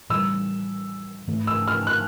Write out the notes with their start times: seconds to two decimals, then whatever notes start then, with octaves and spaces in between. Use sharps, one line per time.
0.10 A2 E3 G3 E6
1.28 G#2 E3 A3
1.47 E6
1.68 F6
1.87 F#6